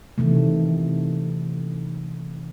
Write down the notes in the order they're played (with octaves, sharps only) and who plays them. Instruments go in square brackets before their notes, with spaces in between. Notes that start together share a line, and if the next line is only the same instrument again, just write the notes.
[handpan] C3 D#3 E3 A3